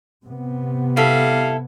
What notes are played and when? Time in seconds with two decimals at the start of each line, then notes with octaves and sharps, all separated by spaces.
0.24 C3 B3
0.97 G3 E4 A4 F5